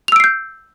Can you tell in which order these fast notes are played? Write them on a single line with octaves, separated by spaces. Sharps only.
F7 E6 D7 C7 G6